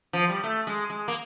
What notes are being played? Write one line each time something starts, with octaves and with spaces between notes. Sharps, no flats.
F3
G3
A3
G#3
G#3
A#3